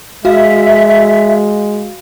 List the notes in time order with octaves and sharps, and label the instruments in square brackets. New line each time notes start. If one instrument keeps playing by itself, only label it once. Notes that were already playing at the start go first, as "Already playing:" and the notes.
[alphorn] G#3 [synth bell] F#4 F5 [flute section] E5